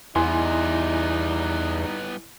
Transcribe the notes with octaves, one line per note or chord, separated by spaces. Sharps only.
E2 G3 B3 D#4 E4 G#5 C6